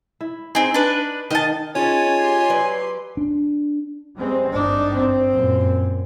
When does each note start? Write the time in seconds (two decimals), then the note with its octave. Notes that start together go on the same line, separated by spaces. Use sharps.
0.21 E4
0.55 C4 D#4 G#4
0.74 D4 B4
1.30 D#3 D#5 A5
1.75 C#4 D#4 F4 G#4 C#5 G#5 A5
2.19 G4 C6
2.50 F#3 B4 D5
3.17 D4
4.16 G3 G#3 C4
4.53 G#1 G2 D4 D#4
4.92 C4
5.32 F#2 A#2